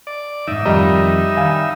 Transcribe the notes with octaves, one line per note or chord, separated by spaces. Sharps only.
D5
E2 G#2 D#4 E5
F2 D#3 G3 D#5 A#5
D#3 F5 G#5